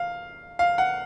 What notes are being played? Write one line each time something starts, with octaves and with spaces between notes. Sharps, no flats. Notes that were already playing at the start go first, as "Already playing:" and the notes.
Already playing: F5
F5
F#5